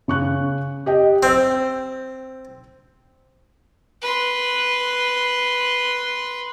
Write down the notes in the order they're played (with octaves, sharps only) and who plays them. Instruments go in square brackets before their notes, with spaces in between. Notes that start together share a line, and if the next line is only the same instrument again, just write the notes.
[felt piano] C#3 C#6 F#6
G4 D#5 G5
[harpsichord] C4 [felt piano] E6 G6
[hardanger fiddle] B4 C6